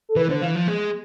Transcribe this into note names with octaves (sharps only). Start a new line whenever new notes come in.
A4
E3 B4
D3 C5
E3 F5
F3
G#3